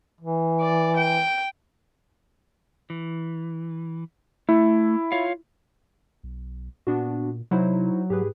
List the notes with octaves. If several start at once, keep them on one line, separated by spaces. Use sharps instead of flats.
E3
D5
G5
E3
A3 E4
F4 C#5 F5
B1
A#2 B3 D4 F#4
C3 F#3 D#4 E4 C5
G#2 G4 G#4 B4